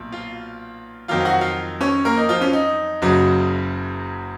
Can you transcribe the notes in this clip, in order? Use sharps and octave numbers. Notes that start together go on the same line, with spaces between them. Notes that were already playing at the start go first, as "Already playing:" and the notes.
Already playing: B1 A#2
F4 F5
F2 D#3 F#3 F4 F5
F5
F#4 F#5
F4 F5
C#4 C#5
A#3 A#4
D#4
F3 F4
C#4
D#4
F#1 F#2 C#3 F#3